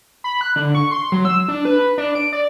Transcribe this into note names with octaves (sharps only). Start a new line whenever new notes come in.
B5
F#6
D3
C#6
C6
F#3
E6
D4
B4
D4
D7
D5